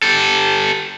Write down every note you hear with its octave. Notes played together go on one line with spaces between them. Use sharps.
G4 A4